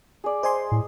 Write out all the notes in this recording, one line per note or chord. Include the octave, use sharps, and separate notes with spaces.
G#4 D5
C5 D#5 G#5 C6
A2